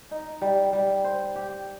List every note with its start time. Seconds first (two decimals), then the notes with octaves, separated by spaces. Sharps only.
0.11 D#4
0.42 G3
0.73 G3
1.04 C5
1.36 G4